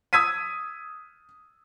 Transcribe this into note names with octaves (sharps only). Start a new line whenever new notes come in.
D#6 E6 G#6 B6 D#7